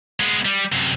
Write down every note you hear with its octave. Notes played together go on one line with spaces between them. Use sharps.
G#3 B3
G3
F#2 C3